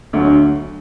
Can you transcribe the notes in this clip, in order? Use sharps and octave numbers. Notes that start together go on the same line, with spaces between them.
D2 D3 F#3